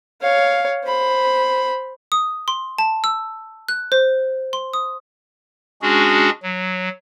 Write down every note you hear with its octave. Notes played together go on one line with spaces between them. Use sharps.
C#5 F5
C5 B5
D#6
C6
A5
E6
F#6
C5
C6
D#6
G#3 C#4 D4 F#4 G#4
F#3